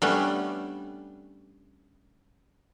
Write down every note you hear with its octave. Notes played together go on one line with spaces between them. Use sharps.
G3 A3 B3 C#4 D4